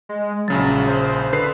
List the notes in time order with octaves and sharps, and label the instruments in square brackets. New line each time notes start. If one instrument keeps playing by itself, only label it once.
[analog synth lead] G#3
[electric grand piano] A#1 C#3 A6 [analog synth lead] F#3
[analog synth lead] C5
[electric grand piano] D3 B4 C7